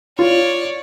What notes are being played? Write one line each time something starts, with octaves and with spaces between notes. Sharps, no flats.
F4 C#5 D5